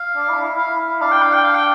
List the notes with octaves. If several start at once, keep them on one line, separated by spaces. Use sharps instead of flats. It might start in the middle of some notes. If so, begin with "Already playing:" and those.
Already playing: F5
D4
E4
E4
E4 F5
D4 F5
G5
F5
G5
F5
G5